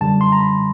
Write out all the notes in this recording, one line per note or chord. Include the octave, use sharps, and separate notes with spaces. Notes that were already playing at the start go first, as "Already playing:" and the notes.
F#2 D3 G3 A5
C6
A#5
B5